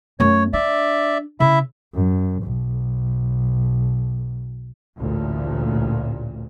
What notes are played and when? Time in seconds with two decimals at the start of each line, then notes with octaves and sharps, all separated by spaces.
0.20 F#2 A3 C#5
0.53 D4 D5 E5
1.40 C#3 E4 E5
1.94 F#2
2.43 B1
4.97 A1 D2 A#2